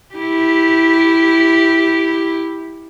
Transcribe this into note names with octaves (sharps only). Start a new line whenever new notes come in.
E4 G4